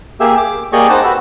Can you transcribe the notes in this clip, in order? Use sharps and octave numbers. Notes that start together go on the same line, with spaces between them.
A#3 G4 G#4 E5
D6
A#3 G4 G#4 D5 D#5 C#6
C4 D#4 F#5 A5
F#4 B4 E6